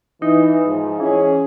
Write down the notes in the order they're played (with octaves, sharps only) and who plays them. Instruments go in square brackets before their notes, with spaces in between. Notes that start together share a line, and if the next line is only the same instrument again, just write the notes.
[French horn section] E3 [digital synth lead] D#4
[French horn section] G#2 F3
[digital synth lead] E3 [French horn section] C#4 G#4